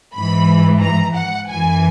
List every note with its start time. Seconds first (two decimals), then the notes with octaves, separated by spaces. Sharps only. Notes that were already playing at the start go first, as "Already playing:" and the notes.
0.14 G#2 E3 B5
0.81 A#5
1.16 F#5
1.50 F#2 E3 G#5